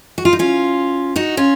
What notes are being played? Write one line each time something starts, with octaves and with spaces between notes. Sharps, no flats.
F#4
F4
D#4
C#4 F4
D#4 F#4
C#4 F4